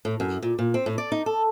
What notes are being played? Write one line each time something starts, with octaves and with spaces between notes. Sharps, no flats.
A2
F#2
A#2
A#2
C4
A2
D5
D#4
A4